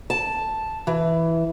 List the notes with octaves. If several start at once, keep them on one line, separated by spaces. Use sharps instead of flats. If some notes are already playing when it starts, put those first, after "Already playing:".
A5
E3